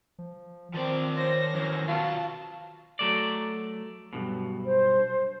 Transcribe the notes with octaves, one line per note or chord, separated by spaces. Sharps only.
F3
D#3 F3 C4 D5
C5 C#5 A#6
F#2 E3
B2 F#3 F4 A5
F#3 A3 D5
B1 G2 B2
C5